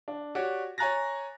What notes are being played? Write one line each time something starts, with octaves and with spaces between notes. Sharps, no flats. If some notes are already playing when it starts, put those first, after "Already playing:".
D4
F#4 G4 C#5 D5
C#5 G#5 A#5 F#6 A6 A#6